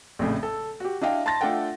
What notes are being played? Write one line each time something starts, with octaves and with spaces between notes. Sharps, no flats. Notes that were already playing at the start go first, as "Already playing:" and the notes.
A#1 F2 A2 C#3
A4
F#4 G4
D4 E4 D#5 F5 G5
A5 C6 A6 A#6
A3 D4 F4 A4 F#5 G5